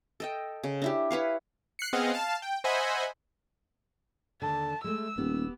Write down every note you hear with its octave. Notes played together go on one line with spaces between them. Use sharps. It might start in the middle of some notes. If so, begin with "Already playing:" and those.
A4 D#5 G5
C#3
D4 E4 G4
E4 B4 C#5 F5
F#6 C7 C#7
B3 C4 G#4 D#5 F5 F#5
F5 A5
G5
C5 D#5 E5 F#5 G#5 B5
D#2 D3 A5
G#3 A3 E6
D#1 B3 G4